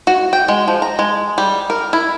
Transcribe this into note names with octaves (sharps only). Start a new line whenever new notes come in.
F#4
G5
G#3
F3
A#5
G#3
G3
A#4
E4